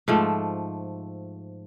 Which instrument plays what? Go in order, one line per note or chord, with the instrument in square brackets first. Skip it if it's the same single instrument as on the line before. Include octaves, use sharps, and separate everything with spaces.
[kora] G#2 F3 A3